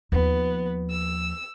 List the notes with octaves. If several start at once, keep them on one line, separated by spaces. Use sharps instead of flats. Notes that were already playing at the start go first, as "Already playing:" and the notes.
D#2 F3 B3
E6